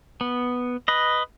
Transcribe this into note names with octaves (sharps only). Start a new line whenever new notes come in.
B3
B4 D#5